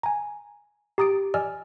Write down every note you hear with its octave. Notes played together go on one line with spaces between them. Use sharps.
G#5 A#5
G4 A#5 D#6 A6 D7
D5 D#5 G#5 E6 F6